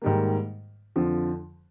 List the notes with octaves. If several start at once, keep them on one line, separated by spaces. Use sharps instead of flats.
G#2 D#3 G3 A#3
F2 D3 F3